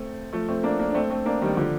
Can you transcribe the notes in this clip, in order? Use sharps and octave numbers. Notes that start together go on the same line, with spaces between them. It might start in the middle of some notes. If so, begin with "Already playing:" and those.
Already playing: A3 C4
F3 A3
A3 C4
A#3 D4
A#3 D4
D4
A3 C4
A3 C4
A#3 D4
D#3 G3
D3 F3